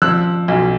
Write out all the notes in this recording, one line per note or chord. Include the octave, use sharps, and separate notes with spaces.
F3 E6 F#6
B1